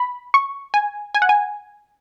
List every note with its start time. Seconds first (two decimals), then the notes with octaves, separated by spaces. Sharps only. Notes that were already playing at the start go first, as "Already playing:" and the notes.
Already playing: B5
0.34 C#6
0.74 G#5
1.15 G#5
1.22 F#5
1.29 G#5